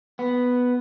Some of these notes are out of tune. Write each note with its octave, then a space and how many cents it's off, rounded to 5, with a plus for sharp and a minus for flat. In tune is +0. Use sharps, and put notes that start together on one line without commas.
B3 +0